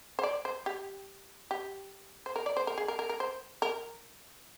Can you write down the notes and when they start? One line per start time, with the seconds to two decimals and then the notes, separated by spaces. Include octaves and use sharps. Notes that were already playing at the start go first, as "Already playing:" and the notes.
0.19 C5
0.23 D5
0.45 C5
0.66 G4
1.51 G4
2.26 C5
2.36 A#4
2.46 D5
2.57 C5
2.67 A#4
2.78 G#4
2.88 A#4
2.99 A#4
3.09 A#4
3.20 C5
3.62 A#4